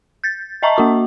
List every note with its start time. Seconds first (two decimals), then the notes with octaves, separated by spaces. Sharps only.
0.24 G6 A6
0.63 D#5 E5 A5 A#5 C#6
0.76 A#3 F#4 C#6